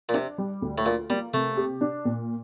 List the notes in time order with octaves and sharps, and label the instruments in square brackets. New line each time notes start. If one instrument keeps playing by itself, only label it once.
[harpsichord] A#2
[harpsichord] C3 [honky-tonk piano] D4
[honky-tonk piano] G3
D2
[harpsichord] A2
[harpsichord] A#2 [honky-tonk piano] F4
[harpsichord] G3 [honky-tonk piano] A#3
[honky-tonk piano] C3 [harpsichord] A3
[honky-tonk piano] G4
D4
A#2